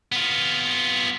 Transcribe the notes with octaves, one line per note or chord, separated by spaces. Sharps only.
B3 F4